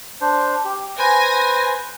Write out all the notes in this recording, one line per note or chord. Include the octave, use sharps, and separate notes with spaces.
D4 C5
G4
B4 C5 G#5 A#6